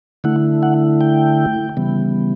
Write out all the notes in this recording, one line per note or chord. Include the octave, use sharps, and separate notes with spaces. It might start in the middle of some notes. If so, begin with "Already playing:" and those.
D3 A3 E4 F#5
F#5
G5
C#3 E3 G3 B3